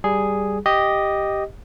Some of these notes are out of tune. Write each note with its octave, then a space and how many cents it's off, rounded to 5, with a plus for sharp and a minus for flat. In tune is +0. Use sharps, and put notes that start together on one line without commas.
G3 +0 G#4 +0
G4 +0 D#5 +0